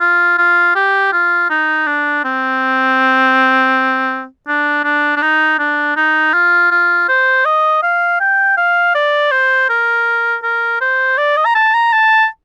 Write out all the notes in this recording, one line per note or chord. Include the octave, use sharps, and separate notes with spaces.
F4
F4
G4
F4
D#4
D4
C4
D4
D4
D4
D#4
D4
D#4
F4
F4
C5
D#5
F5
G5
F5
D5
C5
A#4
A#4
C5
D5
D#5
A#5
A5
A#5
A5